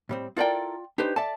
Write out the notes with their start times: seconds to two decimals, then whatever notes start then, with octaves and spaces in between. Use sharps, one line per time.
0.09 A2 G3 C4
0.37 E4 F4 A4 A#4 D5 G5
0.98 D4 D#4 G4 B4 C5
1.16 A4 D5 E5 A5